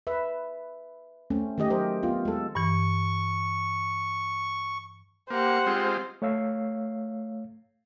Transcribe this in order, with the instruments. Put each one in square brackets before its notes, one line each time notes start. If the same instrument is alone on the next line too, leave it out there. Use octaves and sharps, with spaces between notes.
[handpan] B4 E5
A3 C4 C#4
D#3 A3 G4 D#5
F#3 G4 A#4 C5
B3 C4 F4
G#3 A4
[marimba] G2 E3 [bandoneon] C#6
[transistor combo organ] A#3 [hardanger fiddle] G4 F#5 [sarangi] C5
[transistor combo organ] G#3 C4 F4
[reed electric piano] A3 C#5 F5 E6